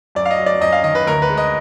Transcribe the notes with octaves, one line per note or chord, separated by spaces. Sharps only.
F#2 D5
F5
D#5
F#3
D5
F#2 D#5
F5
D#3 D#5
B4
D2 A#4
B4
G#3
D#5